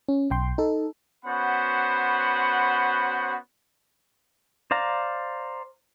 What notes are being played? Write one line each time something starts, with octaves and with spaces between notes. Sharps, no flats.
C#4
B1 G5 C6
D#4 A4
B3 C#4 F#4 C5 F#5 B5
C5 D5 F5 A#5